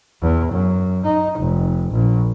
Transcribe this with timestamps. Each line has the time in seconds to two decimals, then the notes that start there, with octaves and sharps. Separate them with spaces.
0.22 E2
0.52 F#2
1.04 D#4
1.39 F1
1.92 A#1